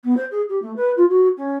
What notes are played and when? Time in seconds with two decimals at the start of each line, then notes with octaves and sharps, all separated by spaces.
0.04 B3
0.17 C5
0.31 G#4
0.49 G4
0.62 A3
0.76 B4
0.97 F4
1.09 F#4
1.37 C#4